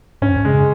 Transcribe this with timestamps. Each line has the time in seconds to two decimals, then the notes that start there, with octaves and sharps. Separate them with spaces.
0.22 G#2 C#4
0.29 F#2
0.36 G#2
0.45 C#3 G#3